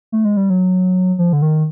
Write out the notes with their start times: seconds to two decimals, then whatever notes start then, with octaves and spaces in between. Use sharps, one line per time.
0.12 A3
0.25 G#3
0.37 G3
0.50 F#3
1.19 F3
1.33 D3
1.42 D#3